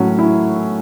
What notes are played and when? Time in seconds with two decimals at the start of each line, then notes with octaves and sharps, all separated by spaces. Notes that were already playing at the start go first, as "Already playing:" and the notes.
Already playing: A2 F#3 C#4
0.19 E4